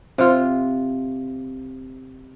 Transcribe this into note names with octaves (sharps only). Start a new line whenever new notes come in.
C3 F4